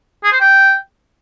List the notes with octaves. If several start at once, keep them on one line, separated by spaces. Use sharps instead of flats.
G#4
C5
G5